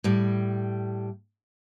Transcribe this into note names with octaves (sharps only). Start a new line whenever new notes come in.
A2 G3